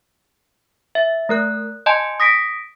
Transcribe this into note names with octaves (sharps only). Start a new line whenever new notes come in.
E5
A3 A#4 F#6
D#5 G#5 A5 C6 G6
D#6 A#6 B6 D7